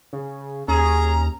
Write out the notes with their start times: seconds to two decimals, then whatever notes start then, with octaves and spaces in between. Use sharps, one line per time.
0.13 C#3
0.68 D#2 C#4 G#4 A#5